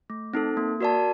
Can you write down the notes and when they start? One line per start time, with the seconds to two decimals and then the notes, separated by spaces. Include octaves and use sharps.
0.10 A3
0.34 C4 D#4 A4
0.57 A#3
0.81 F#4 A#4 D5 A5